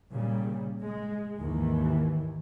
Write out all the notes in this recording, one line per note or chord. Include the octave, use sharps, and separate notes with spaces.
A#2 C#3 G3
G#3
D#2 G#2 D#3 E3